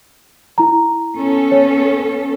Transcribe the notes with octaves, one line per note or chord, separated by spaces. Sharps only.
E4 A#5
B3 C#4 A4
C#5